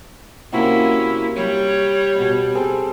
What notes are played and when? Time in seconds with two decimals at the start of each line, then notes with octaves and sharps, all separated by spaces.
0.52 C3 A#3 C#4 E4 F#4 A#5
1.35 G3 C#5
2.15 D#2 B2
2.55 C4 G#4 A4